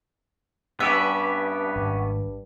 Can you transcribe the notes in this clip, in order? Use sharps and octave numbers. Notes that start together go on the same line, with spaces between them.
G2 B3 C#4 G4 B4 E5
G#1